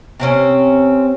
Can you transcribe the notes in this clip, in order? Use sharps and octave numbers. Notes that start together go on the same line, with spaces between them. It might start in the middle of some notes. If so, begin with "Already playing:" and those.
C3 C4 C#4